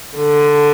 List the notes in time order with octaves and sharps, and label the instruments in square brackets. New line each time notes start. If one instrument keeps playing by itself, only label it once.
[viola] D3